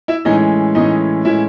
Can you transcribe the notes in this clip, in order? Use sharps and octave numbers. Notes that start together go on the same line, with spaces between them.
E4 E5
A2 E3 G#3 C#4 D#4 D#5
A2 E3 G#3 C#4 D#4 D#5
A2 E3 G#3 C#4 E4 E5